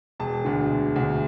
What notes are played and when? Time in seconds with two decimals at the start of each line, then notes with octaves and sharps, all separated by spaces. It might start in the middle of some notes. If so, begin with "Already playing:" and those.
0.20 E1 A5
0.44 D2 D3
0.71 E1
0.96 D2 D3